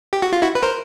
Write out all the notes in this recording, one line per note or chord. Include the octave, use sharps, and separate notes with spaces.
G4
F#4
F4
E4 F#4
B4
A#4 C5